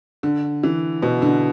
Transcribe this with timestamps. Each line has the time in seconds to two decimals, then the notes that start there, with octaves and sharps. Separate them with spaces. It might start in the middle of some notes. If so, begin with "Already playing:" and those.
0.23 D3
0.63 E3
1.02 B2
1.22 D3